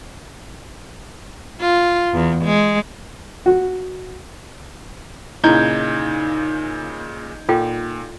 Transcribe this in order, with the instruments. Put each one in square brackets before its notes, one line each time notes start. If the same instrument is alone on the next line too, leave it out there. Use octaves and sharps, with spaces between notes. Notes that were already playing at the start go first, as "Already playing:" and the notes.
[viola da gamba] F4
E2
G#3
[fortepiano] F#4
[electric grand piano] A#2 C#3 [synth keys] D#4 G6 G#6 [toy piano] E4
[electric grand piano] A#2 [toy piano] F4 A4 G5